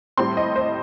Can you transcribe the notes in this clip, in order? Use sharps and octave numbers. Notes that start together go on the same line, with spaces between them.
A2 G3 C4 C6
D#5
C5